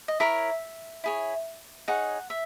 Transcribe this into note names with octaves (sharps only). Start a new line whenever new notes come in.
D#5
E4 A#4 C#5 E5
E4 G#4 C#5
D#4 G#4 C#5 F#5
E5